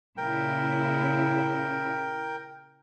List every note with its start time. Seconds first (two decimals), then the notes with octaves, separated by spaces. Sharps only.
0.17 A#2 C#3 E4 A#4 G5